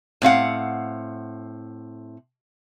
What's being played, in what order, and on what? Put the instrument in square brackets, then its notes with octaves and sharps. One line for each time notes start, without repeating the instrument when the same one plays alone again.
[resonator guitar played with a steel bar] A2 C4 F5 F#5